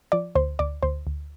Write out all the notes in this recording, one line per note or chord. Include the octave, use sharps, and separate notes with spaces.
F3 D5
D2 C5
D2 D5
D2 C5
D2